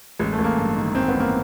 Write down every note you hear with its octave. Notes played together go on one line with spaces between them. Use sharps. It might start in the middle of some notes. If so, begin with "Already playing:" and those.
A1 G#3
A3
A1
A#3
G2
D#3
A1 C4
B3
A1
A#3